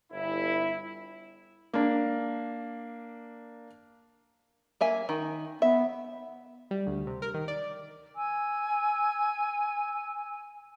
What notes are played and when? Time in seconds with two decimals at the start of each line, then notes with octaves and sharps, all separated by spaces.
0.12 G1 E4
1.74 A#3 D4
4.81 A#3 E5 G#5
5.09 D#3
5.62 B3 E5
6.71 G3
6.87 D2
7.07 C3
7.22 A#4
7.34 D#3
7.48 D5
8.16 G#5 E6